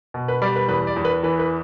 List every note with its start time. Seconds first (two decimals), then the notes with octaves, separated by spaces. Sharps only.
0.14 B2
0.28 B4
0.42 G3 D5
0.56 B4
0.68 E2 B4
0.87 D5
0.96 E2
1.05 B4
1.23 E3 B4
1.39 B4